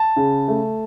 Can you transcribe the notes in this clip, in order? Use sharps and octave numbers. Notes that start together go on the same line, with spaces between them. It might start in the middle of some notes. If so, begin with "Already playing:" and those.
Already playing: A5
C#3
A3